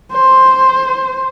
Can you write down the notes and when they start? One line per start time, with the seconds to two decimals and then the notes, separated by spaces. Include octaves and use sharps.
0.12 C5